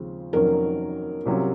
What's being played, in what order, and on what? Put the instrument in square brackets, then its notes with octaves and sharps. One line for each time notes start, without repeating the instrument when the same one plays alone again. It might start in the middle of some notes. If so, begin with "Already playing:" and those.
Already playing: [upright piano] D#2 C#3 F3 G#3 C4
[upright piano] F1 F2 D#3 F#3 C#4 [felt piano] A#4
[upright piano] C2 C3 F#3 C#4 F4